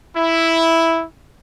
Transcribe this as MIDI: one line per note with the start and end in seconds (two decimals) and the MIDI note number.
0.16 1.04 64